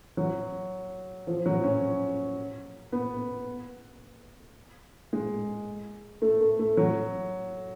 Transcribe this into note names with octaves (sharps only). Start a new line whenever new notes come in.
F#3
F3
F#3
C#4
B3
G#3
A3
A3
A3
F#3